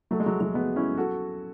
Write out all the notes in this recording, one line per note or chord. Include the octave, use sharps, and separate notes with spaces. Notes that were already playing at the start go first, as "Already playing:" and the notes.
F#3 A3
G#3
F#3
F#3 A3
G#3 B3
C#4 E4
F#4 A4